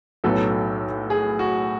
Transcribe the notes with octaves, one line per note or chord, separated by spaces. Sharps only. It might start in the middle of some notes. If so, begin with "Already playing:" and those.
B1 A2 F#3 B3 A4
G#4
F#4